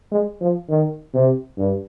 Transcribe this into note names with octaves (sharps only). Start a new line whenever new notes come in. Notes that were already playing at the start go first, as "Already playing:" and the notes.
G#3
F3
D#3
C3
G2